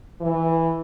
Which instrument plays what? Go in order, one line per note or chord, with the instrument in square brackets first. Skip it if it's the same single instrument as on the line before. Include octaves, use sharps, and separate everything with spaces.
[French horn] E3